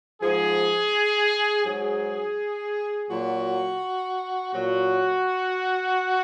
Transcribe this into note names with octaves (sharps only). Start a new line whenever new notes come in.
G#2 F3 G#4
G#2 F#3 G#4
A#2 F#3 F#4
A#2 F#3 F#4